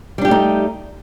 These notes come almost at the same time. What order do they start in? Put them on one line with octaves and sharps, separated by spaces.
G3 D4 G4 A3 D#4